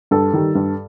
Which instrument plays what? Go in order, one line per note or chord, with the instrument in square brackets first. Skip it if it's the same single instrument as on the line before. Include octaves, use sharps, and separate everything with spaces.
[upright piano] G2 A4
D#3 G3
G2